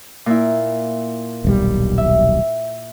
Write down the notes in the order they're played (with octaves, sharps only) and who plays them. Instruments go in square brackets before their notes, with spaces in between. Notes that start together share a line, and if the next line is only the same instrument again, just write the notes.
[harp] A#2 E4
[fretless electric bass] D#1 B1 G3
[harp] E5